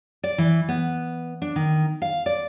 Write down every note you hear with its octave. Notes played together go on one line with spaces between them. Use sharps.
D5
E3
B3
D4
D#3
F5
D5